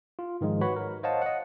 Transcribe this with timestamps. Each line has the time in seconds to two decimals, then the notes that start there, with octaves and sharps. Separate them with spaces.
0.19 F4
0.41 G#2 D#3 F3 G#3
0.61 F#4 B4 C#5 B5
0.76 A#4
1.03 C5 C#5 D#5 F5 F#5 A5
1.22 D#5 F#5